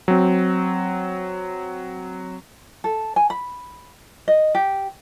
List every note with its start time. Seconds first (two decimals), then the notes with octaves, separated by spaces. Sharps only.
0.08 F#3 C4
2.84 A4
3.16 G#5
3.30 B5
4.28 D#5
4.55 G4